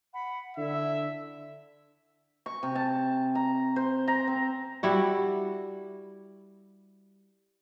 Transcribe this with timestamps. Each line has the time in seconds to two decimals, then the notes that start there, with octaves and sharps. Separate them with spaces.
0.13 F#5 B5
0.57 D3 E4 E5
2.46 C#6
2.63 C3
2.75 A5
3.35 A#5
3.76 C5
4.08 A#5
4.28 C4
4.83 G3 E4 F#4